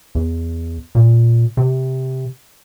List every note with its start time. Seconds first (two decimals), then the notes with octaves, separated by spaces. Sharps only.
0.15 E2
0.95 A#2
1.57 C3